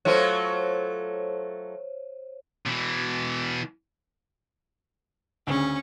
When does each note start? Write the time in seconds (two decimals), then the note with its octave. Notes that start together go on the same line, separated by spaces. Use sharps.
0.05 F#3 A3 F4 C5 C#5
2.66 B2 E3
5.47 D2 C#3 C#4 C#6